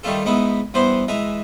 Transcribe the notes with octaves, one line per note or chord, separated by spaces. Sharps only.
D#3 G3 A3 F4 A4
G#2 G#3 B3 D#4 E4
G2 E3 B3 C5 C6
E3 G#3 E5 A#5